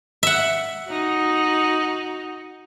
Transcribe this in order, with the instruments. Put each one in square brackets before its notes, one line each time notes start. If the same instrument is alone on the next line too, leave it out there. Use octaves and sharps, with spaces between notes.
[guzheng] E5 F#5
[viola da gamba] D#4 F#4